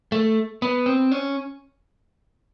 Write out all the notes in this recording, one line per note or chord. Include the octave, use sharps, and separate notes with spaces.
A3
B3
C4
C#4